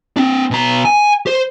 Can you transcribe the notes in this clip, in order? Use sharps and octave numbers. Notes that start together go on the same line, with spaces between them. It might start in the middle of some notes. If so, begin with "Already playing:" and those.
C4 D4
B2 A#5
G#5
C5